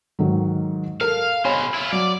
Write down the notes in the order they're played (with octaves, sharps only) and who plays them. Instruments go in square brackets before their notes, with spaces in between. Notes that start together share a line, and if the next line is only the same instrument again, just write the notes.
[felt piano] G#2 D#3 F#3
[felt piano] A4 A#4 [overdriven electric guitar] F5
[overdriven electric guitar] B2 C5 [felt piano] C#5 G#5 B5
[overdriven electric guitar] E4 F4
[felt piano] F#3 [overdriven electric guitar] D5